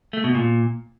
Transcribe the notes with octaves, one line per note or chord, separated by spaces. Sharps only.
A3
B2
A#2